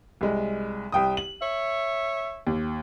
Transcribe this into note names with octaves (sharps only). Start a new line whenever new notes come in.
C2 G#3
C2 G5 D#6
F#7
C#5 E5
D#2